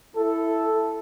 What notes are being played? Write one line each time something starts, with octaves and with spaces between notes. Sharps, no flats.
E4 A4